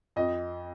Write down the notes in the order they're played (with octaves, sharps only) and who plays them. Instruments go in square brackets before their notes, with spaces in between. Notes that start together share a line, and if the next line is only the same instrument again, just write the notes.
[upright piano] F2 D#5